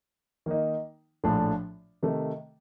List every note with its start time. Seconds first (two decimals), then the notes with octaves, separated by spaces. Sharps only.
0.46 D#3 A#3 D#4
1.24 A#1 A2 F3 A3 D4
2.03 C3 D#3 A3